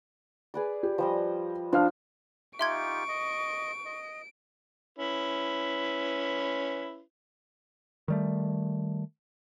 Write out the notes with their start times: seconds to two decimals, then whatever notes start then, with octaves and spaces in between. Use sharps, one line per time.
0.54 G#4 B4 D5
0.83 G4
0.98 F3 G3 D#5
1.73 F3 D4 F5 F6
2.59 D#4 F4 G4 E5 C6 C#6 G#6 D7
3.09 D#5
3.86 D#5
4.98 C#4 E4 B4
8.08 D#3 G3 A3